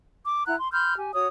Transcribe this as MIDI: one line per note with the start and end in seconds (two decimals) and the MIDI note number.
0.25 0.46 86
0.46 0.55 64
0.46 0.55 78
0.46 0.55 82
0.46 0.55 90
0.58 0.71 84
0.72 0.94 83
0.72 0.94 84
0.72 0.94 89
0.72 0.94 91
0.97 1.11 67
0.97 1.11 80
1.13 1.28 66
1.13 1.28 73
1.13 1.28 87